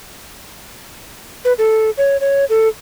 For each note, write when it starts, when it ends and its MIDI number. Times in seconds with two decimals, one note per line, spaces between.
1.45 1.53 71
1.58 1.90 69
1.98 2.17 73
2.21 2.45 73
2.50 2.68 69